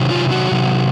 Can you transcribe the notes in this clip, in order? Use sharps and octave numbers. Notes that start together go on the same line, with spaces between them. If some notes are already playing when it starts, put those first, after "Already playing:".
Already playing: C3 D#3 F#3
F4
F#4
C3 D#3 F#3